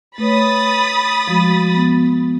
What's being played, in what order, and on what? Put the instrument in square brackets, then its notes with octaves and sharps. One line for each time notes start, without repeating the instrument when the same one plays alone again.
[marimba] A3 B4 C#5 [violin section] B5 D#6 A6
[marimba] F3 G#3 F#4
B3